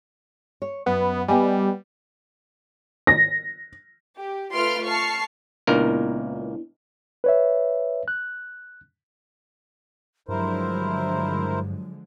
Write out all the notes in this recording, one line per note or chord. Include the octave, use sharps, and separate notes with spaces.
C#5
F#2 B3
G3 B3 D#5 G#5
A#6
G4
A3 F4 B4 C6 F6 D7
A5 C#6 F6 C7
C#2 A#2 B3 D4 E4 A#4
B4 C#5 E5
F#6
G2 D3 F3 F#3 G#3 E4 A#4 C5